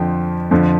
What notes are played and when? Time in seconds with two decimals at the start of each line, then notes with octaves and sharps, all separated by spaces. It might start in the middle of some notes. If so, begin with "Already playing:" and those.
Already playing: F2 D3 F3 G5
0.51 F2 D3 F3